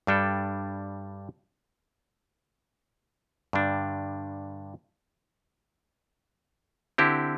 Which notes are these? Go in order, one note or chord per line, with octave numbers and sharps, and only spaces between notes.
G2 G3 D4 A4
G2 D3 G3 D4
D3 C4 E4 G4